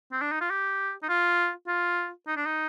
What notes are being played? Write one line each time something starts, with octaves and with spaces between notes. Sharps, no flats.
C4
D4
D#4
F4
G4
D#4
F4
F4
D#4
D4
D#4